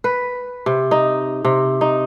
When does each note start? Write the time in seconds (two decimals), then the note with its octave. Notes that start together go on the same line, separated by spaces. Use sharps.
0.04 B4
0.66 C3
0.91 D#4
1.45 C3
1.81 D#4